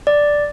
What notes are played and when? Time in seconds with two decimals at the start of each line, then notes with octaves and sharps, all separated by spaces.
0.07 D5